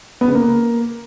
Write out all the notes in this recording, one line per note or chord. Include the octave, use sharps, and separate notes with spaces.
B3
C#3
A#3